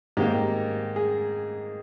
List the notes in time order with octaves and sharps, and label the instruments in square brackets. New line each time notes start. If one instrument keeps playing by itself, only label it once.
[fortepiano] G#2 D#3 A#3 G4
G#4